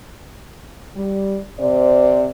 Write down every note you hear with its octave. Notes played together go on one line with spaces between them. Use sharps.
G3
C3 C5 D5